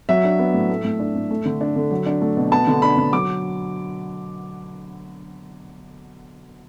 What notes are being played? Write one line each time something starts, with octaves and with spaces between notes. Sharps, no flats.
F#3 E5
D4
B3
A2
A3
A2
D4
A2
A3
D3
D4
D3
F#3
D4
A3
B2
B3 A5
D3
D4 B5
D3
F#3 D6